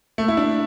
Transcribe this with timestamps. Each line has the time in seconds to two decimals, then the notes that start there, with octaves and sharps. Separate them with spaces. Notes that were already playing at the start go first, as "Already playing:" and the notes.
0.18 A3
0.28 E4
0.37 D4